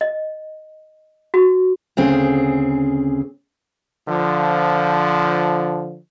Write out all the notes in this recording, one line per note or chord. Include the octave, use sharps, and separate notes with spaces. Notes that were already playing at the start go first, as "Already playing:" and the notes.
D#5
F#4
D2 C#3 C4 G#4
D3 F3